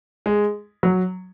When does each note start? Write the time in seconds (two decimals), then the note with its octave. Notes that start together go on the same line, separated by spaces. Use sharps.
0.26 G#3
0.83 F#3